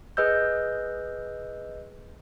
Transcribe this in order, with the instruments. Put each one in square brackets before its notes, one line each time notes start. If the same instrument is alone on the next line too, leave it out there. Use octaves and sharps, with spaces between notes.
[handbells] G#4 B4 D#5 E6 G6